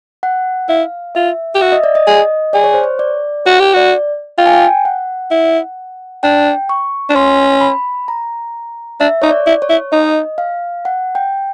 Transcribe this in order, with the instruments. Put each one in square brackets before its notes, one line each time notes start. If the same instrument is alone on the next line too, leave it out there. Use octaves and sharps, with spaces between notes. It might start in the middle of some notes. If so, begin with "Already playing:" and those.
[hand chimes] F#5
[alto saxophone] E4 [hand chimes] F5
[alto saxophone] F4 [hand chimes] E5
[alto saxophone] G4
[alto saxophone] F#4 [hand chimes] E5
[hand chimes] D#5
D5
D#5
[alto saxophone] G#4
[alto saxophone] G#4 [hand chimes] D5
[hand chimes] C#5
C5
C#5
D5
[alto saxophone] F#4 [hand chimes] C#5
[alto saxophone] G4
[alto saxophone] F#4 [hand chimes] D5
[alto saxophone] F4 [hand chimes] G5
[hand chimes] G#5
G5
F#5
[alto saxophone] E4
[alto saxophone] D4 [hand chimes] G5
[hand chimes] C#6
[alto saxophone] D4
[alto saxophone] C#4 [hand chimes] C6
[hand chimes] B5
A#5
[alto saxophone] D4 [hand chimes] E5
[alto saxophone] D#4 [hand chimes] C#5
[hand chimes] D5
[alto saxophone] E4
[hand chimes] C#5
[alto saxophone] E4
[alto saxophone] D#4 [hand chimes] D#5
[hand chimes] F5
F#5
G5